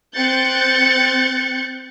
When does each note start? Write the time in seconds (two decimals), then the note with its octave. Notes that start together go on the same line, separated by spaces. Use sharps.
0.16 C4 F#6 G6 A6 C#7